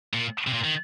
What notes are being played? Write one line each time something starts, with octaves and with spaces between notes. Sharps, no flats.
A#2
C3
A#2
D#3